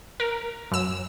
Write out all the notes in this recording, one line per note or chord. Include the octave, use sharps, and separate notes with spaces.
A#4
F#2 E6